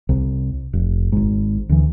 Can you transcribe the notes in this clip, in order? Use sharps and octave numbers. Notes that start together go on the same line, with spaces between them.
C2
F1
G#1 G#2
D2 E3